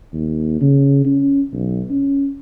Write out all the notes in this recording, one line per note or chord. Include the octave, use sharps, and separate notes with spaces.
D#2
C#3
C#4
B1
C#4